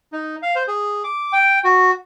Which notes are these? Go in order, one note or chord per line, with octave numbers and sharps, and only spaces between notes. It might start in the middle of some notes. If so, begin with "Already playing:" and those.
D#4
F5
C5
G#4
D6
G5
F#4